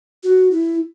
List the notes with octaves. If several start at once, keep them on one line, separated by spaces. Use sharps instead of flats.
F#4
E4